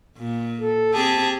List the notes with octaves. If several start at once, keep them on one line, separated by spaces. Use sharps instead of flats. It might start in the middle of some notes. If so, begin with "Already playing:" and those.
A#2
A4
C4 G4 G#4 A5